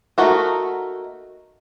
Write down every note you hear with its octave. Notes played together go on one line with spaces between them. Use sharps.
A3 A#3 D#4 F#4 A#4